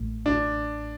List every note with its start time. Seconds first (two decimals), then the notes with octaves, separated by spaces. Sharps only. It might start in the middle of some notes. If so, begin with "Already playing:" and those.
Already playing: A1 A2 A3
0.26 D4